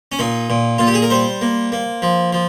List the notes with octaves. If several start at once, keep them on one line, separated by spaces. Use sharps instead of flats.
C#4
A#2 D#4
A#2
A#2 F4
G4
G#4
A#4
G3 C5
A#3
A#3
F3
F3